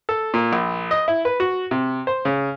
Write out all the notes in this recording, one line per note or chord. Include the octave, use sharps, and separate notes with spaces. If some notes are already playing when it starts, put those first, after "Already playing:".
A4
A#2
A#1
D#5
E4
B4
F#4
C3
C5
C#3